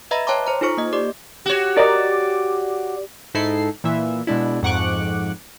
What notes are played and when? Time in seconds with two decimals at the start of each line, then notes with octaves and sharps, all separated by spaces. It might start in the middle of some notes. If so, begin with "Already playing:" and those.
0.11 B4 D#5 E5 A#5 B5 A#6
0.27 C#5 G5 A5 A#5 C6 D6
0.46 C5 A#5
0.61 D#4 F4 A4 C5 C#6
0.77 A#3 D#5
0.93 G4 D5 D6
1.46 F#4 G4 C#5
1.77 A#4 D5 D#5 A#5
3.34 G#2 D#4 E4 A4 C7
3.84 A#2 E3 E5
4.27 B2 G#3 D4 E4
4.63 F2 G#2 F#5 C#6 D6 F#6